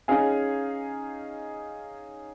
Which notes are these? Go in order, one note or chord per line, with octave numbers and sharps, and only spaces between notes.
C#4 D#4 G#4 F5 G#5